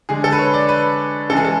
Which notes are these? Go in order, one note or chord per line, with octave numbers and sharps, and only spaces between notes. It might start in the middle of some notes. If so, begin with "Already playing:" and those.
D3 G#3 G#4
A4
B4
C#5
D5
B4
C#3 E3 G#3 A4
G#4
A4